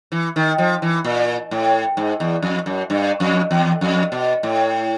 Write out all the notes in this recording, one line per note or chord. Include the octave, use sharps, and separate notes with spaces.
E3
D#3
F3
E3
A#2
A2
G#2
E2
F2
F#2
G2
F2
E2
F2
B2
A2